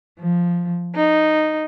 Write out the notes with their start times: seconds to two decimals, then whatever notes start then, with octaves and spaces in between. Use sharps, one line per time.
0.19 F3
0.94 D#4